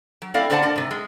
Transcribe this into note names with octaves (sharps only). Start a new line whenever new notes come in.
F#3
A3 C4 E4 D5 F5
A#2 D3 C5 D5 F#5 A5
A#4 D5
G#2 C3
G#3